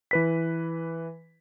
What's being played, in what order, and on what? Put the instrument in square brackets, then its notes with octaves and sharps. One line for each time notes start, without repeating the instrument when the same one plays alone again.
[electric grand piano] E3 B4 B6